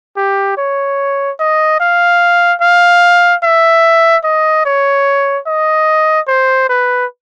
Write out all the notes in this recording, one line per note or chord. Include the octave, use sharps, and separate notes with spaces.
G4
C#5
D#5
F5
F5
E5
D#5
C#5
D#5
C5
B4